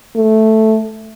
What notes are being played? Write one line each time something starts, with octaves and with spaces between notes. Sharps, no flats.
A3